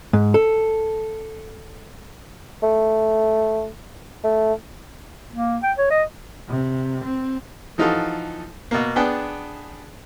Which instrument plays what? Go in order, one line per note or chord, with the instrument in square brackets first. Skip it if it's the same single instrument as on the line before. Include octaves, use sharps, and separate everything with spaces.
[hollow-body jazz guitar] G#2
A4
[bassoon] A3
A3
[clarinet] A#3
G5
C#5
D#5
[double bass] C3
C4
[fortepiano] E3 F3 D#4 F4 F#4 A4
B2 A#3
B3 D4 G#4 G5 A5